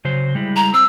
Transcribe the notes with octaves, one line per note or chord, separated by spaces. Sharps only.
C#3 F#3 C5
G3 G#3 E4
A#5
C4 C5 E6